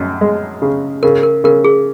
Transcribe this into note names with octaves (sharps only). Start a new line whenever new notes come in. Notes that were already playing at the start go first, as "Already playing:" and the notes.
Already playing: F#2 D#5
G#3
C#3
C#3 A#4
A#4
C#3 A#4
G#4